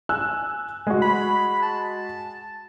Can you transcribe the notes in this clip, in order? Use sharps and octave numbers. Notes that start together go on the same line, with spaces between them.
G#5 E6 F#6
G#3 F#4
B5
A5